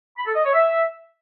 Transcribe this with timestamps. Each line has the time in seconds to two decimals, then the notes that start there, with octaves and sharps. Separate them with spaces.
0.17 B5
0.26 A4
0.35 D#5
0.44 C#5
0.53 E5